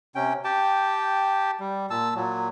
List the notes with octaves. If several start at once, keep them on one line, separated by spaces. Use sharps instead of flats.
C3 C#4 G5
G4 G5 A5
G3
A#2 A5 E6
A#2 F#3